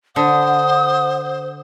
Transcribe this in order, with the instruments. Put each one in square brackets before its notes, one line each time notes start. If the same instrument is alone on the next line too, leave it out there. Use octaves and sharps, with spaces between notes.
[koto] D3 [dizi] C5 [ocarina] F#5 [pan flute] D#6